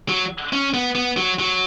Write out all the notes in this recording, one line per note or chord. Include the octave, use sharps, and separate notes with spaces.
F#3
C#4
B3
B3
F#3
F#3